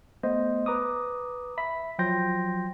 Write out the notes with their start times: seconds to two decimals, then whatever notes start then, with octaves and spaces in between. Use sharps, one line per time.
0.23 A3 B3 C5 D#5
0.66 B4 A#5 D6 D#6
1.58 E5 B5 B6
1.99 F3 F#3 G5 C6 G6 A#6